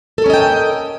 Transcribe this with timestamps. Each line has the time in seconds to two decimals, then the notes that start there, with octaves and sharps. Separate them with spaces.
0.18 A4
0.22 A#4
0.26 C#4
0.30 D#5
0.34 G5